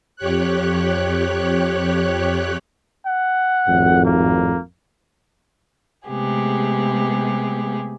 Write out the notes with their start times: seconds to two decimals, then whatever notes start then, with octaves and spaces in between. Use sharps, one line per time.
0.16 F2 G4 C#5 F#6
3.06 F#5
3.67 G#1 F2 A2
4.05 A#3
6.08 C3 G#3 A3 B3 G4 G#4